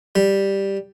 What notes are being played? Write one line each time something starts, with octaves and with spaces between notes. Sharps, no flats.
G3